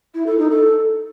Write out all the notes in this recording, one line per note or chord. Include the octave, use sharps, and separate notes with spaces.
E4
A4
D#4
A4